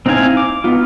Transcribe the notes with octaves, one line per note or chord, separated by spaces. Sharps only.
C4 D#4 E4 F5 G#5
D6
B3 D#4 F4